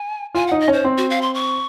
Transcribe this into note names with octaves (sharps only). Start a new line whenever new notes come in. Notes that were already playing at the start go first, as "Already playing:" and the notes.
Already playing: G#5
F4 G#5
D#4 F#5
D#5
C#4 C5
C4
F#4
F5
C6
C#6